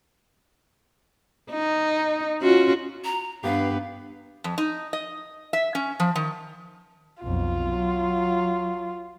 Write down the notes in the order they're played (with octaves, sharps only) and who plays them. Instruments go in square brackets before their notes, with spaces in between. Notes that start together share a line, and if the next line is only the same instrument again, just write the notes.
[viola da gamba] D#4
C#4 F4 F#4
[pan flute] A#5
[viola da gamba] G2 B4 [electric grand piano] B3 G4 [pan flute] F5
[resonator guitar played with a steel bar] F2
D#4
D#5
E5
C#4
F3
D#3
[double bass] B1 F2 [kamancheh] F4
[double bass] F#3